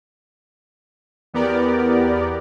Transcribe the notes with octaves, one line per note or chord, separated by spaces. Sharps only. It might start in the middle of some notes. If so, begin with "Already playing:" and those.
E2 B3 G4 A#4 D5